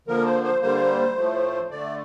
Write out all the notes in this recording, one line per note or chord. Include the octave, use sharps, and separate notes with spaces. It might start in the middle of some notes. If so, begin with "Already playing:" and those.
D3 F3 A#3 A#4
C5
C5
D3 G3 A#3 C5
A2 F3 A3
D3 A3 D5